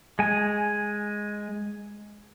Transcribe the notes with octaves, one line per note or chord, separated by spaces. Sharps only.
G#3 G#5